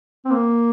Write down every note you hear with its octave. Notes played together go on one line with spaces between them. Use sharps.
C4
A#3